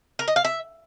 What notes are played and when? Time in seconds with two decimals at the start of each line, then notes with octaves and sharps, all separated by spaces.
0.19 A#4
0.28 D#5
0.36 F5
0.44 E5